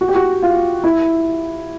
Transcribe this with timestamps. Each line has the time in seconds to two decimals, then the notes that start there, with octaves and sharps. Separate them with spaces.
0.01 F#4
0.08 G4
0.15 F#4
0.43 F4
0.84 E4